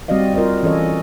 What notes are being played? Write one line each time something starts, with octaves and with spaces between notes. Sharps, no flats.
G3 C4 F#4 D5 D#5 F5
F4 A#4 C5 D#5
E3 C#4 A4 C#5 D#5